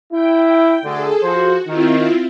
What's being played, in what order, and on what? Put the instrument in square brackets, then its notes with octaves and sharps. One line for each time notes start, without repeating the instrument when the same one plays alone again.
[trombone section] E4 [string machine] G5
[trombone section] D2 D3 [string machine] G#4 A4
[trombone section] F3 C5 [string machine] F#4
[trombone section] D#3 [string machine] C4 E4 F4